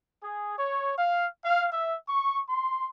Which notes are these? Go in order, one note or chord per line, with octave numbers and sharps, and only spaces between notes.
G#4
C#5
F5
F5
E5
C#6
C6